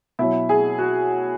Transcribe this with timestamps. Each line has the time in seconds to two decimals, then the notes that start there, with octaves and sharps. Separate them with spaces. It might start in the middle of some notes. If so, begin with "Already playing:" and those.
0.19 B2 F#3 E4
0.49 G#4
0.78 F#4